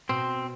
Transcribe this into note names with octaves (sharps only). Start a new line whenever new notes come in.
B2 C4